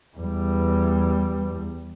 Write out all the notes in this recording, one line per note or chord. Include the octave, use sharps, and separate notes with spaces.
E2 G3